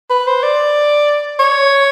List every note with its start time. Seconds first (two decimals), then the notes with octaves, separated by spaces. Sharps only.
0.10 B4
0.27 C5
0.43 D5
1.40 C#5